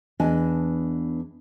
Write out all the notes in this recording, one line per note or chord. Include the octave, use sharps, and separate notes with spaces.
E2 B3 D4 D#5 G#5 A5